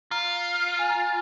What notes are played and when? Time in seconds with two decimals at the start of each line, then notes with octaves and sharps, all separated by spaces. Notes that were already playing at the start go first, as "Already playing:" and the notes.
0.11 F4 A#5
0.79 G#5
0.89 A#5
1.00 G#5